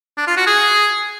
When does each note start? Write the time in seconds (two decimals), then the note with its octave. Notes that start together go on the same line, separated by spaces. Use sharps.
0.17 D4
0.27 F4
0.37 F#4
0.47 G#4